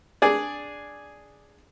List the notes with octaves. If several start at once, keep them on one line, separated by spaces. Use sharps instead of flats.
D4 G#4 D5